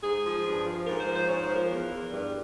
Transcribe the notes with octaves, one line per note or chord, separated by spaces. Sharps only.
G#2 G#4
F3
G2
F3
G#2 A#4
C5
F3
C5
G#2 C#5
C5
F3
A#4
E2
E2
G2